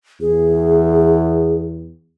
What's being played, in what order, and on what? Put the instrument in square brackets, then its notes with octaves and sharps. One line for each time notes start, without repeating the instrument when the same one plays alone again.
[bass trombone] E2 [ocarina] G#4